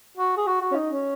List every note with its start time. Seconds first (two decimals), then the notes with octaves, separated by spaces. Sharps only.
0.17 F#4
0.37 G#4
0.47 F#4
0.61 F#4
0.72 C#4
0.75 D#4
0.90 C#4